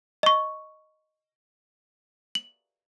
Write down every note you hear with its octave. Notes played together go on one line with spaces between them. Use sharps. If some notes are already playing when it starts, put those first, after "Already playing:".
D#5 C#6
F#7